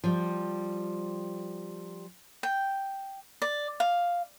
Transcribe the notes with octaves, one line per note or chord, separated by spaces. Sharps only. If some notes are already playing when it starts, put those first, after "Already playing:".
F3 G3
G5
D5
F5